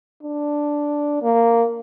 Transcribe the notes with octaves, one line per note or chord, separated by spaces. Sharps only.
D4
A#3